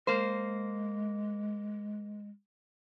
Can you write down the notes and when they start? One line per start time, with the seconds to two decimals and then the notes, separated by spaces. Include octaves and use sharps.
0.07 G#3 A#3 C5